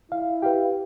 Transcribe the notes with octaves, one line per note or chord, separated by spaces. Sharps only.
E4 F5
G4 B4 F5 G5